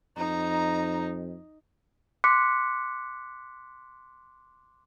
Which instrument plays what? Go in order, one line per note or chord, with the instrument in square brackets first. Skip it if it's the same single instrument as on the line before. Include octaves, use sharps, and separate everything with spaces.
[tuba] F2 [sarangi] D#4 [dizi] A#5
[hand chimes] C6 D6 F#6 B6 C#7